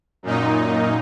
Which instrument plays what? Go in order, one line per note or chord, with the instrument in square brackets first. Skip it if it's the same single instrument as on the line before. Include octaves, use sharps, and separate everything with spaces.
[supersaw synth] F#2 A#2 D#4